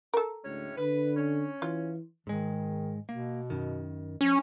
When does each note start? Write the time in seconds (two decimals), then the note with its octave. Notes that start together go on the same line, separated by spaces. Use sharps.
0.14 A4 A#4
0.45 D2 A2 G#3 C#4
0.77 D3 B4
1.16 C#4
1.62 E3 F4
2.27 G#2 D#3 G#3
3.09 B2 A#3
3.50 F#2 D#3
4.21 F3 C#4